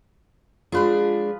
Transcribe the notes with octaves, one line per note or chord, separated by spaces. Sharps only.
F3 G#3 D4 F4 G#4 B4